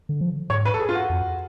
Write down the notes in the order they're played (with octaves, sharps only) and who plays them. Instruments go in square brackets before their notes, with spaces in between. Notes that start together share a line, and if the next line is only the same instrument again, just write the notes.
[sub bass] D3
F3
[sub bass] G#2 [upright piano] C#5
[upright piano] B4
A4
G#4
F4
F#4
[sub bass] F2